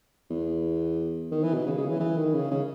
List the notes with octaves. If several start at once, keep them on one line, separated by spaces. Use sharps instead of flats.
E2
D#3
E3
B2
C#3
C#3
E3
E3
D#3
C#3
C#3